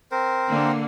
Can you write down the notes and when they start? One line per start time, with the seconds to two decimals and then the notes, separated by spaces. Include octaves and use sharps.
0.12 C4 A#4 C5
0.49 D3 A#3